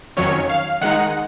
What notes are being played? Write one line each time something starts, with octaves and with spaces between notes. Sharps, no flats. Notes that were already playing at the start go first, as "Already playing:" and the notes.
F2 D#3 F#3 C#4 C#5
F5
D#3 G#3 D#4 F#5